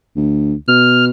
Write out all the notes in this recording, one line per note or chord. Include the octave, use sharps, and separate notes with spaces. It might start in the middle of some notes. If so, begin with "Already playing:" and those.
D2
B2 F6